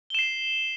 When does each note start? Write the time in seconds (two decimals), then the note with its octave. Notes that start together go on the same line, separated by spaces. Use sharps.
0.10 G7
0.14 E7
0.19 C7